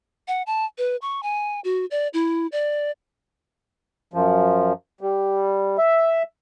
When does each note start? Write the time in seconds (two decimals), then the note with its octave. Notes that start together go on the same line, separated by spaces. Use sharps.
0.28 F#5
0.46 A5
0.78 B4
1.02 C#6
1.23 G#5
1.64 F#4
1.91 D5
2.14 E4
2.52 D5
4.13 F#2 F3
5.01 G3
5.78 E5